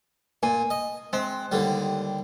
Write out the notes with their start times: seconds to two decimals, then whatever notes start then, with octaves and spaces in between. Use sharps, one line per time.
0.43 A#2 G#5
0.70 D#5
1.13 G#3 C4
1.52 D#2 D3 G3